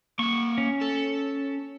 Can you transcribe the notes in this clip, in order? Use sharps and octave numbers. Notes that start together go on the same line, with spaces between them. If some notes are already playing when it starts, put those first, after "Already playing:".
A#3 F#5 C#6
C#4
A4